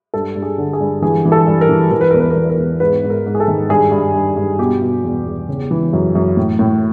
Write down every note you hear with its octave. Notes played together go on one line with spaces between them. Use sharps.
G2 A4
G2
G#4
D3
G#4
G2
E3 G#4
E3
A4
G2
A#4
E3
E3 A#4
B4
E2 A#4
B4
A#4
E3 B4
A#4
E2
G#2 B4
G#2
A#4
G#2
G#4
A4
D#3
G2 G#4
G2
G2
G2
B2 G4
B2
E2
E2
C#3
E3
F#2
F#2
A2
A2